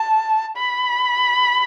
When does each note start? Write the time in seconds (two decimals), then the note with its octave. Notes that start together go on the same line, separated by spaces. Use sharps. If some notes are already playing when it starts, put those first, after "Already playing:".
Already playing: A5
0.57 B5